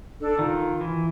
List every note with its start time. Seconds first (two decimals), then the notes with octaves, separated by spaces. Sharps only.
0.21 D4 A4
0.39 D#3 F4
0.81 E3